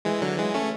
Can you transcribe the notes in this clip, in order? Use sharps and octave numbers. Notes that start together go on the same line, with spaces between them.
E3 G#3
D3 F#3
E3 G#3
A3 C#4